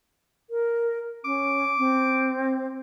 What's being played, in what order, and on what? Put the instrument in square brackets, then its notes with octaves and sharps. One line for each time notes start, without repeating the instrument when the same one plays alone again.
[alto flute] A#4
[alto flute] C#4 [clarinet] D6
[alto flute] C4